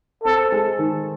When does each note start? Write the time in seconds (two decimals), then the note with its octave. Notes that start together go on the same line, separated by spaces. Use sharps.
0.24 C4 A4
0.52 G#3
0.79 D#3